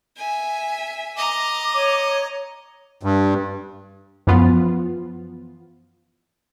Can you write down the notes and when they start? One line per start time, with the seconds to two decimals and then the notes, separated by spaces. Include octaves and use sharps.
0.17 E5 G#5
1.17 D#5 A#5 D6
1.74 C#5 D#7
3.03 G2
4.27 F#2 E3 F3 B3 F4